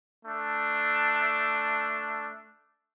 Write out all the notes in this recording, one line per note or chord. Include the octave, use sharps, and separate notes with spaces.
A3 D4